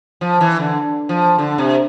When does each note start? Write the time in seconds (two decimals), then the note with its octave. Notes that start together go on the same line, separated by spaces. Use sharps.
0.21 F3
0.41 E3
0.60 D3
1.09 F3
1.38 D3
1.58 C3